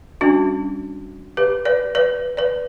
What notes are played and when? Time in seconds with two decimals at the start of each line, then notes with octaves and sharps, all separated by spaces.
0.21 G3 C#4 D4 F#4
1.37 G4 B4
1.65 B4 D5
1.95 B4 D5
2.37 B4 D5